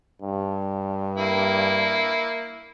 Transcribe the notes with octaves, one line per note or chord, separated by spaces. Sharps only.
G2
A#3 E4